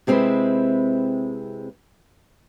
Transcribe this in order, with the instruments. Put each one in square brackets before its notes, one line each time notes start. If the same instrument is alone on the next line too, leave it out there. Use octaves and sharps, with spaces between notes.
[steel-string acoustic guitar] C3 G#3 C4 C#4 E4 B4